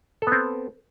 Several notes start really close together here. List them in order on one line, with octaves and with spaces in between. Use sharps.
A4 B3 C4